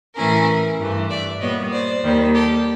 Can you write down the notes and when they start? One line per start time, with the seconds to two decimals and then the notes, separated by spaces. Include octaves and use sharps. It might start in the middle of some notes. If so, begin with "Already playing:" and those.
0.17 A2 E3 A3 C#4 E4 G#4 A#4
0.79 G2 E3 A3
1.10 D5 E5
1.41 A#2 G3 B3 C#5 D#5
1.72 C5 D5
2.03 D#2 D#3 G3
2.34 G4 A4